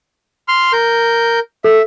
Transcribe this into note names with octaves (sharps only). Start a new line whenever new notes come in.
C6 F6
A#4 G6
A4 E5